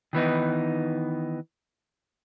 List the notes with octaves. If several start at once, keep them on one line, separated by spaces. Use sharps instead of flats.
D#3 E3 B3 D#4